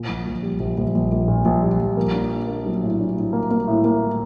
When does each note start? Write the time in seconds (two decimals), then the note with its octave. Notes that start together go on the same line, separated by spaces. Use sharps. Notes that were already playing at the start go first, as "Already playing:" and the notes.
Already playing: A#2
0.08 A#1
0.27 A#1
0.43 G3
0.59 A#1
0.78 A#1
0.95 A#1
1.12 A#1
1.28 A#2
1.45 A#1
1.63 G3
1.80 A#1
1.97 A#3
2.13 D4
2.31 D4
2.47 A#3
2.66 F#3
2.82 A2
3.00 D4
3.16 A2
3.33 A#3
3.51 A#3
3.67 A2
3.85 A#3